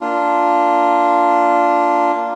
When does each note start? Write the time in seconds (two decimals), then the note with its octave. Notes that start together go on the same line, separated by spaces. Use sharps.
0.01 A#3 D4 F4